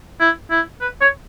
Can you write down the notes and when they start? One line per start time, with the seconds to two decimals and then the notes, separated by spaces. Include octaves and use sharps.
0.20 E4
0.51 E4
0.81 B4
1.01 C#5